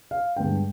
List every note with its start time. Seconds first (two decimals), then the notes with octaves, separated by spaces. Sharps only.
0.11 F5
0.36 G2 D3 G#3 B3 D4 G5